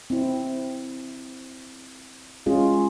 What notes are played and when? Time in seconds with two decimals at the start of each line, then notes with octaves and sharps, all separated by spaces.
0.10 C4 E4
2.46 G#3 C#4 F4 G#4